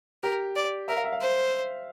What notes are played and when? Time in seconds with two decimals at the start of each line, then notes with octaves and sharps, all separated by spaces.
0.23 G4 A#4
0.56 D5
0.88 A#4 E5
0.96 F5
1.04 E5
1.12 F5
1.21 C5